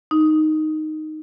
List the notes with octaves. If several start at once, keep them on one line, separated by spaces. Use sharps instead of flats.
D#4